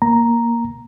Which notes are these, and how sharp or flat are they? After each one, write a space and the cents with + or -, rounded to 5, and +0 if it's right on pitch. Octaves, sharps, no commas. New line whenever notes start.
A#3 +5 A#5 +0